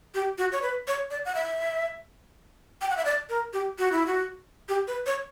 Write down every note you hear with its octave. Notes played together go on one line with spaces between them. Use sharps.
G4
F#4
C#5
B4
C#5
D5
F#5
E5
G5
F#5
E5
D5
A#4
G4
F#4
E4
F#4
G4
B4
C#5